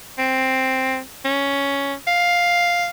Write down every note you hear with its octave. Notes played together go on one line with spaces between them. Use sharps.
C4
C#4
F5